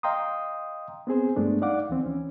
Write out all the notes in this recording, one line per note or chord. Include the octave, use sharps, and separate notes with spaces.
D#5 F5 G5 A#5 C6 D#6
B3 C4 G#4 C5
G2 G#3 A3 B3 D4
D#4 D5 F5 F#5 D6
D2 E3 C4
E3 C#4